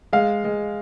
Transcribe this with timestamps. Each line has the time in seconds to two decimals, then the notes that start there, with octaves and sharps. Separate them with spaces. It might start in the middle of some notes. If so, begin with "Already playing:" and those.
0.13 G#3 F5
0.44 G#3